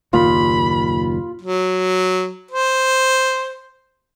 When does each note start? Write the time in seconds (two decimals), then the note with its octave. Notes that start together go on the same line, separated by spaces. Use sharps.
0.13 F#1 D#2 A#2 F4 B5
1.40 F#3
2.51 C5